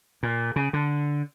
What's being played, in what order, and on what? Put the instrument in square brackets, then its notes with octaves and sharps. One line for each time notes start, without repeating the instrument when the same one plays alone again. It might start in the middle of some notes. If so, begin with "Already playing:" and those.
[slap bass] A#2
C#3
D3